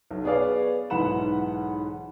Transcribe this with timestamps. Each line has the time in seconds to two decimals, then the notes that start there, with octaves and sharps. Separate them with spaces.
0.11 B1
0.24 B3 G#4 C#5 D5 F5
0.90 B1 G#2 E3 F#5 B5 E7